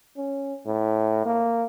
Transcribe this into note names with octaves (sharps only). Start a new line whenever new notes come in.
C#4
A2
A#3